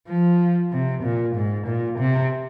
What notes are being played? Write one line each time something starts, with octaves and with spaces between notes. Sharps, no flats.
F3
C3
A#2
G#2
A#2
C3